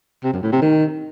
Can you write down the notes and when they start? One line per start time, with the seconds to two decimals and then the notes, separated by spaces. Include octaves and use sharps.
0.24 C3
0.33 F#2
0.43 A2
0.52 C3
0.62 D#3